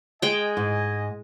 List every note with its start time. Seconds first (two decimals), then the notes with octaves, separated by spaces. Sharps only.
0.22 G#3 D#5 G5 G#5
0.57 G#2